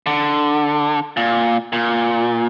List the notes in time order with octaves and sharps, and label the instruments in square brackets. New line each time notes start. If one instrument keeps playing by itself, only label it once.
[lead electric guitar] D3
A#2
A#2